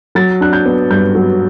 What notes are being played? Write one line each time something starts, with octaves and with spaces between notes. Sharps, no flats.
F#3 A6
D4 F#6
G6
B3
G2 G6
F#3